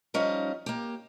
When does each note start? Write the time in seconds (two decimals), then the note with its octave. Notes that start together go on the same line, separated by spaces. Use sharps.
0.14 F3 G3 C#4 D#4 D#5 F5
0.66 A#3 G4